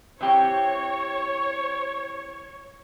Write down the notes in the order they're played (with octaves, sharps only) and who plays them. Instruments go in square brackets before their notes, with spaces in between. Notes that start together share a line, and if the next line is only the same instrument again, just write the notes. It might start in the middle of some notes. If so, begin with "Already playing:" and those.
[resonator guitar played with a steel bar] E3 C4 G4 [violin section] C#5